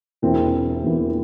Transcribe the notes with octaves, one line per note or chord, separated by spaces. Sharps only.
E1 E2 E3 A#3 C4
E1 E2 E3 A#3